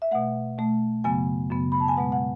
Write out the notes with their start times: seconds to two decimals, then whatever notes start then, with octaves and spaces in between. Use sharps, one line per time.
0.02 E5
0.11 B2 A3 F#5
0.58 B2 A3
1.04 F#2 C#3 F#3 B3 G#5
1.50 F#2 C#3 F#3 B3
1.72 B5
1.80 A5
1.88 G#5
1.97 B2 G#3 B3 F#5
2.12 F#5